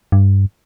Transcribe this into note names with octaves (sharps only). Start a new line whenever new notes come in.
G2